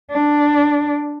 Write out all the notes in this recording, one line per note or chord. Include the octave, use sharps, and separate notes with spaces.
D4